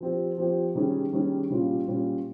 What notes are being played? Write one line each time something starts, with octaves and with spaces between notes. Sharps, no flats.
F3 C4 G4
F3 C4 G4
D#3 G3 C#4 G#4
D#3 G3 C#4 G#4
A#2 G3 C#4 F4
A#2 G3 C#4 F4